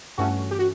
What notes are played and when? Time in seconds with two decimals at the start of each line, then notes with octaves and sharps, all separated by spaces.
0.18 G2 E3 A3 C#4 F#4
0.51 G4
0.59 F#4